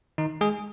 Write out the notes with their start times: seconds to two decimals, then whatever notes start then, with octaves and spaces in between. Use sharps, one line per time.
0.18 D#3 D#4
0.41 G#3 G#4